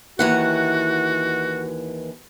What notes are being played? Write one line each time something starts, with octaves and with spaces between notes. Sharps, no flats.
D#2 E3 F#4 F#5